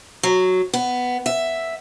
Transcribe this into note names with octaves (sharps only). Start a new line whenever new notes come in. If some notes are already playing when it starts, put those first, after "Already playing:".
F#3
B3
E5